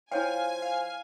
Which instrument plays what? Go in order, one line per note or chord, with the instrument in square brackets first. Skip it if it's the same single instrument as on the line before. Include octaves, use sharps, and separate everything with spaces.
[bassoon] F3 [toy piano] E4 C#5 G5 [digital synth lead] F5 [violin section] G#5
[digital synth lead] F5